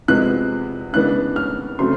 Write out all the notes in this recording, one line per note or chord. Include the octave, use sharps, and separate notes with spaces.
E2 C3 F3 G#3 B3 F#6
C#3 E3 G#3 B3 D4 F#6
F6
C#3 F#3 A3 C4 C6